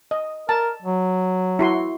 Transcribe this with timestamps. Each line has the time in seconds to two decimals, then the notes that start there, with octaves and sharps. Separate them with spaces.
0.11 D#5
0.49 A#4 A5
0.83 F#3
1.59 E4 F#4 C6